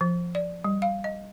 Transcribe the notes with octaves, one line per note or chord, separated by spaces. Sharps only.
F3
D5
G3
F5
D#5